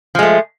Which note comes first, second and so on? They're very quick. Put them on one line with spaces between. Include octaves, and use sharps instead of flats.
F3 G#3 A3